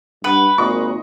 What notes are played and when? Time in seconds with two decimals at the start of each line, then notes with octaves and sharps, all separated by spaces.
0.24 G2 B4 F#5
0.58 G#1 A#2 D#5 C6 C#6